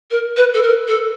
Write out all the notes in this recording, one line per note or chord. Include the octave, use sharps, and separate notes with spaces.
A#4
B4
A4
A#4
A4